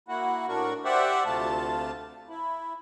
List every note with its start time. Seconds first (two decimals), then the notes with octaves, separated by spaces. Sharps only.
0.09 A#3 E4 F#4 F#5
0.48 A2 D4 F#4 A#4 C#6
0.84 G4 C5 D5 E5 F#5
1.26 D2 C3 A3 F4 A5
2.29 E4